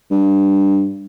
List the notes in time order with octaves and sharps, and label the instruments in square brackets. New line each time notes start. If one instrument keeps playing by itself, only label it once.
[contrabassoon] G2